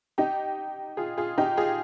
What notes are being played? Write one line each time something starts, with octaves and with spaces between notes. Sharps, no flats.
D#4 G4
F4 G#4
F4 G#4
D#4 G4
F4 G#4